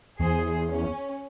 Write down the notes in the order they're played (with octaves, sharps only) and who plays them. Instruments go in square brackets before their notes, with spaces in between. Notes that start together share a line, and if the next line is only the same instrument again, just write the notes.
[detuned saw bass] E2 [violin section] G#4 C5 C7
[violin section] C#4